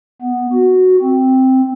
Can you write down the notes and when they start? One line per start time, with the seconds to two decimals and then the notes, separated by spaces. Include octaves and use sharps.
0.22 B3
0.52 F#4
1.02 C4